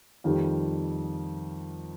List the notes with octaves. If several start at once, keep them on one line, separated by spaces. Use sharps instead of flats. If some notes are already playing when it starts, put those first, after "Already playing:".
F2 D#3 G3